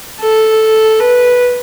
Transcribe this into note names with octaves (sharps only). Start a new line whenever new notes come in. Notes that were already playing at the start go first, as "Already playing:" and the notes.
A4
B4